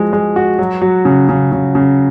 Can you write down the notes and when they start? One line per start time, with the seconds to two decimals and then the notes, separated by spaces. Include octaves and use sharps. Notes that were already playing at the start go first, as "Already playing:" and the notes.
Already playing: F3 G#3 F#4
0.13 G#3
0.36 F#4
0.59 F#3
0.82 F#3
1.05 C#3
1.29 C#3
1.52 C#3
1.75 C#3